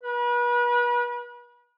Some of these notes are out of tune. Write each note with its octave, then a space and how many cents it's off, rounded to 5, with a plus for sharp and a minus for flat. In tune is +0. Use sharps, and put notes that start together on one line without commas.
B4 -35